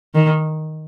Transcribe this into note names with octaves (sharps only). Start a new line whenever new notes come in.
D#3